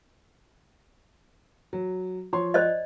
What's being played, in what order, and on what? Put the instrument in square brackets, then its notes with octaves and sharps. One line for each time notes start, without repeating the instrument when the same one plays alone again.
[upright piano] F#3
F3 C#5 C6
[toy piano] C5 D5 D#5